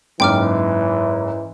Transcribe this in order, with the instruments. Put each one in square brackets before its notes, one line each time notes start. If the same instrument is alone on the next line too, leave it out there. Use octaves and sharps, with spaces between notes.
[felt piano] F#1 G#2 [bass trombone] E3 [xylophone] G5 D6 F6